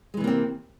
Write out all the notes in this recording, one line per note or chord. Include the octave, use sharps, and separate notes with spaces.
C3 E3 G#3 A#3 C4